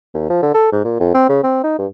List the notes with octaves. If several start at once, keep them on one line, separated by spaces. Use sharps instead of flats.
D#2
F3
D3
A4
G#2
A#2
F2
C4
C#3
C4
D#4
G2